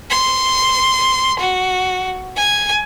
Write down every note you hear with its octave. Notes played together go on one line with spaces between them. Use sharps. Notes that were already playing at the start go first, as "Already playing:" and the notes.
C6
F#4
G#5